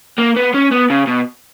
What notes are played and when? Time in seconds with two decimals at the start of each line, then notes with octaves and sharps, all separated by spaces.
0.18 A#3
0.36 B3
0.54 C#4
0.71 B3
0.90 C#3
1.08 B2